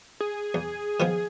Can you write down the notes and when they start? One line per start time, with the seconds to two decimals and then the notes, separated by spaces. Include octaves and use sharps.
0.21 G#4
0.54 E2
1.00 D#3 F3 B3